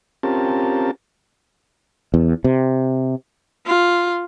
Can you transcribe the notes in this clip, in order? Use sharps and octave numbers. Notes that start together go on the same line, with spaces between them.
C4 C#4 F4 G4 A#4 A5
E2
C3
F4